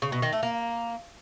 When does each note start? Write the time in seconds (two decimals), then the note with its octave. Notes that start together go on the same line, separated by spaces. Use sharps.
0.02 C#3
0.12 B2
0.22 D#3
0.33 A3
0.43 A#3